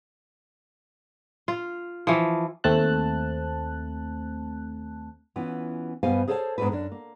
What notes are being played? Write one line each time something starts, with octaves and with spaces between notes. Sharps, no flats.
F4
E3 F3
D#2 A3 C4 A5 F#6
E3 B3 C#4 F4
G2 B2 B3 C5 F5 G#5
G#4 A4 C5 C#5 E5 A5
G#2 B3 D4 F#4 A4 B4
F#2 D4
A#3